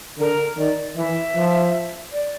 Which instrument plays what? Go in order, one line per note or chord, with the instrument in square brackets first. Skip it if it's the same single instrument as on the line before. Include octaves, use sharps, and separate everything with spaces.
[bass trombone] D3 [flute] A#4
[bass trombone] D#3 [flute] D5
[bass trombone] E3 [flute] E5
[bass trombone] F3
[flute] D5